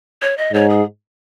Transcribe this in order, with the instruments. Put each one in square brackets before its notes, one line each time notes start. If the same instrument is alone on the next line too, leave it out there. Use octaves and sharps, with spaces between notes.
[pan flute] C#5
D#5
[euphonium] G#2 [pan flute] C#5
[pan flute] G#4